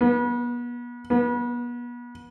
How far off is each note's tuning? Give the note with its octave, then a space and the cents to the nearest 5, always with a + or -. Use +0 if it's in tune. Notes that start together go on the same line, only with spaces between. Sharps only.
B3 -35
B3 -35